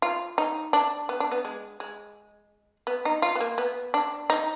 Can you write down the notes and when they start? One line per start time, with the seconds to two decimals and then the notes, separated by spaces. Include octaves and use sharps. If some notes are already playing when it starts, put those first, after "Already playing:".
0.02 F4
0.38 D#4
0.73 D4
1.09 B3
1.20 D4
1.31 B3
1.45 G#3
1.80 G#3
2.87 B3
3.05 D#4
3.22 F4
3.35 B3
3.40 A#3
3.58 B3
3.94 D4
4.30 D#4